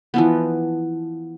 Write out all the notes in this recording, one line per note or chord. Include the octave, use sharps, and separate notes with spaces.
E3 F3 B3